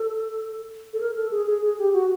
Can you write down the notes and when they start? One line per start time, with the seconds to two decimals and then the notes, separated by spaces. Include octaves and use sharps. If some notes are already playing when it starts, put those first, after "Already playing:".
Already playing: A4
0.93 A4
1.00 A#4
1.16 A4
1.31 G#4
1.47 G#4
1.62 G#4
1.78 G4
1.93 F#4